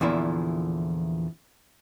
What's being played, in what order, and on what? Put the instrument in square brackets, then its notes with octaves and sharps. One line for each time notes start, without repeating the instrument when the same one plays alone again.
[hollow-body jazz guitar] E2 A#2 D3 F3 E4